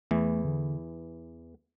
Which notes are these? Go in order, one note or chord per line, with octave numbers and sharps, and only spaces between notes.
E2 E3 A3
D3